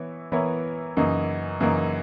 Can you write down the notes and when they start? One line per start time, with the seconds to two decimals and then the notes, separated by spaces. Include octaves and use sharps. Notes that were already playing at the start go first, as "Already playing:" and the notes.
Already playing: E3 B3 E4 C#5
0.32 E3 B3 E4 A#4 C#5
0.97 F#2 C#3 E3 A#3 D#4
1.60 F#2 C#3 E3 A#3 D#4